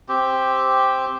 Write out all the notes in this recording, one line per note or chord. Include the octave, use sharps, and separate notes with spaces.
C4 G4